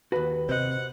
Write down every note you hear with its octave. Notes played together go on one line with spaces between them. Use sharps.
D#2 F#4 B4
C3 C5 D#5 F#5